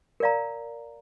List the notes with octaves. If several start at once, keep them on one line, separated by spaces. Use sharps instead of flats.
A#4 D5 F5 A#5